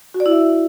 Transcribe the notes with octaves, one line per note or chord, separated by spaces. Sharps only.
F#4
D5
E4
E5